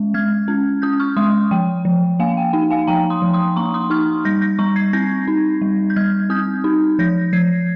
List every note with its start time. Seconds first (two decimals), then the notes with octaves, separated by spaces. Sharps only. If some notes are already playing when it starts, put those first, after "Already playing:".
Already playing: G#3 C#4
0.14 G#3 F6 G#6
0.48 C#4
0.82 C#4 D#6 G6
1.00 C#6 F6
1.17 G#3 C6 D#6
1.51 F3 G5
1.85 F3
2.20 A#3 F5 G#5
2.37 G5
2.53 D#4 G5
2.71 F5 G#5
2.87 F3 G5 A#5
3.10 C6 D#6
3.22 F3
3.33 C6 D#6
3.56 A#3 A#5 C#6
3.74 C6 D#6
3.90 D#4 C#6 F6
4.25 G3 G6 A#6
4.41 G6 A#6
4.59 G3 A#5 C#6
4.76 G#6 C7
4.93 C4 G6 A#6
5.28 D#4
5.62 G3
5.90 G6
5.96 G3 F6 G#6
6.30 C4 D#6 G6
6.64 D#4
6.99 F3 G6 A#6
7.33 F3 G#6 C7